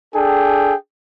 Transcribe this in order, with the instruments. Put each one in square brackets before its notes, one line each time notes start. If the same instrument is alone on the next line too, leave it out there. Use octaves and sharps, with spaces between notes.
[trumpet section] D4 G#4 A4 G5